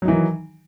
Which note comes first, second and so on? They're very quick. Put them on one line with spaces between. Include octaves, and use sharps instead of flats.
F#3 D#4 E3 D#3